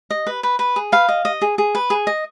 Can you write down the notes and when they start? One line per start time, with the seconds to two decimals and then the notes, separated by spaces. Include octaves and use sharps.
0.11 D#5
0.27 B4
0.43 B4
0.59 B4
0.76 G#4
0.92 B4 F5
1.09 D#5
1.25 D#5
1.42 G#4
1.58 G#4
1.75 B4
1.90 G#4
2.07 D#5